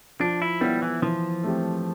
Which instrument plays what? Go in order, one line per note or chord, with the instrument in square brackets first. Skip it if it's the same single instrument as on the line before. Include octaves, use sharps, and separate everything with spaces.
[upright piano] F3 [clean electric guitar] D4
[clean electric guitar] E4
[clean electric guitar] G3 [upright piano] B3 E4
[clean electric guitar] E3
[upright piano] E3 [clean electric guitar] F3
[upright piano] A3 C4 G4